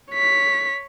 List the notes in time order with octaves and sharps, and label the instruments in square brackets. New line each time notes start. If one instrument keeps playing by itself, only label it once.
[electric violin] C#5 B6